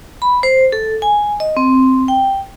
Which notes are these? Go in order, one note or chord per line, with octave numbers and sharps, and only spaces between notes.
B5
C5
A4
G#5
D#5
C4
G5